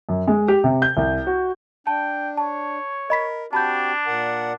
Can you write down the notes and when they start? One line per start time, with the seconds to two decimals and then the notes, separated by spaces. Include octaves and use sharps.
0.09 F#2
0.28 G#3
0.48 G4
0.64 C3
0.82 G6
0.97 C2
1.27 F#4
1.87 D4 G5 A5
2.37 C#5 A5
3.10 A#4 D#5 B5 B6
3.53 C4 D4 F#4 G4 A5 B5 G6
4.07 A#2 A#4 F#5